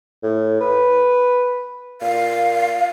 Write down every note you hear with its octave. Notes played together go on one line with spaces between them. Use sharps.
A2
B4
A#2 F5